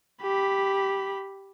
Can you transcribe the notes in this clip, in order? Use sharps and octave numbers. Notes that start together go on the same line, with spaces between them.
G4 B5